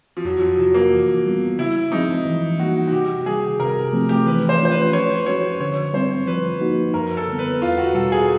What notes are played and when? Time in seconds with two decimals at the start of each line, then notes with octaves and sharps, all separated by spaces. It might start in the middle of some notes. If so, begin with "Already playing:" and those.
0.17 F3
0.25 F2 F#3
0.41 F3
0.58 C3 F3 F#3
0.74 A#3
0.92 E3
1.25 G3 B3
1.58 C#3 E4
1.92 F3 G#3 C4 D#4
2.26 E3
2.59 G3 A#3 D#4 F#4
2.87 F#4
2.92 C3 G4
3.26 D#3 G3 G#4
3.60 C3 A#4
3.93 F3 A3 C4
4.09 G4
4.26 E3 B4
4.49 C5
4.60 A3 C#4 F4 C5
4.71 B4
4.93 F3 C#5
5.26 G#3 C#4 F#4 C#5
5.60 D3 C#5
5.94 G3 C4 C5
6.27 F3 B4
6.61 A#3 D#4 F#4
6.94 F#2 A#4
7.17 A4
7.28 D3 G3 B3
7.39 B4
7.61 E2 F4
7.78 F#4
7.95 B2 G3 A4
8.12 G#4